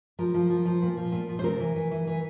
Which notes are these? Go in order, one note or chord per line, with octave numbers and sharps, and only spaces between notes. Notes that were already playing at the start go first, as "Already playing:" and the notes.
F3 A#4
F3
F3
F3
A#2
F3
A#2
F3
C5
C3 A#4
E3
E3
E3
E3